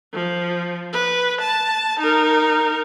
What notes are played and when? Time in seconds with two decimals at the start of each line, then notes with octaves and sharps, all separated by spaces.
0.13 F3
0.93 B4
1.41 A5
1.99 D#4 A#4